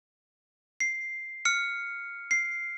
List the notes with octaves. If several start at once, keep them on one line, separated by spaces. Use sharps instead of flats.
C7
F6 C#7
C7